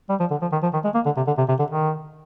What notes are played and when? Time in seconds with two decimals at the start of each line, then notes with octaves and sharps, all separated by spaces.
0.09 G3
0.20 F3
0.31 D3
0.42 F3
0.52 D#3
0.63 F3
0.73 D#3
0.84 G#3
0.95 A#3
1.06 D3
1.17 C3
1.27 D3
1.38 C3
1.49 C3
1.59 D3
1.71 D#3